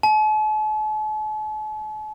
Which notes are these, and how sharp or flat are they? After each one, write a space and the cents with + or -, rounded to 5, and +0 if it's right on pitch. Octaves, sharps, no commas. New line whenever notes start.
A5 -45